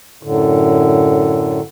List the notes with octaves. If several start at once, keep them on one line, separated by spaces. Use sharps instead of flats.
F#2 A2 D3